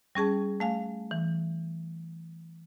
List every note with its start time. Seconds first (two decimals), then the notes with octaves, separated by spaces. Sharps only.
0.15 G3 C#4 G#4 A5
0.60 A3 F5 G#5
1.11 E3